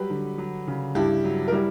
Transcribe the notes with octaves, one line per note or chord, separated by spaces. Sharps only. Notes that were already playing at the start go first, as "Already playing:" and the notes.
Already playing: F#3 G3 G4 B4
D3
F#3
C#3
G2 E4 G4
F#3
A#4
G3 E4 G4